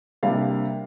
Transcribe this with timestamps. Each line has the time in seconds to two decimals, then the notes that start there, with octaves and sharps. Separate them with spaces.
0.23 C3 G3 A#3 D4 F5